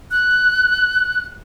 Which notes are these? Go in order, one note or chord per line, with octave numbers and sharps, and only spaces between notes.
F#6